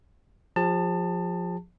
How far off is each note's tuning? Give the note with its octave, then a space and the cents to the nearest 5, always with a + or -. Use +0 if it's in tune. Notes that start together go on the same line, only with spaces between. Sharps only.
F3 +20 G#4 -35 A5 +20